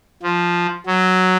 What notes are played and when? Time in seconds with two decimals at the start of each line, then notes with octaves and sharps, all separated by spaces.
0.23 F3
0.87 F#3